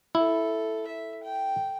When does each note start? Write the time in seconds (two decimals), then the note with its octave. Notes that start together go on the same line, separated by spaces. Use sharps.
0.15 E4 A4
0.87 E5
1.23 G5